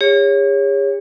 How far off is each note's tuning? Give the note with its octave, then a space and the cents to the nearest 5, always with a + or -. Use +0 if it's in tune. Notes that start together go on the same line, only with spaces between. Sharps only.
G#4 -45 C#5 +0